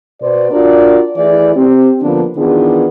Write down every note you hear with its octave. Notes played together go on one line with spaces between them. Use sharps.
B2 B3 B4 C5 D5
D4 F4 F#4 A#4 D5
E3 A3 E4 G#4 D5
C4 G4
D3 F3 A#3 B3 D4
D#3 E3 B3 D4 F4 G#4